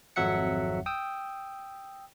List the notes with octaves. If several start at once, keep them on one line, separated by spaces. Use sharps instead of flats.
G#1 F2 F#3 E5 F#5 C#7
G5 D#6 E6